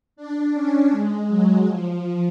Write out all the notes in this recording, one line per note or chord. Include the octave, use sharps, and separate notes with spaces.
D4
C#4
G#3
F#3
F3